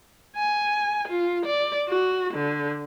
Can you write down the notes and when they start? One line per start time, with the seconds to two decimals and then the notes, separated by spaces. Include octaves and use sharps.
0.37 G#5
1.08 F4
1.46 D5
1.89 F#4
2.34 D3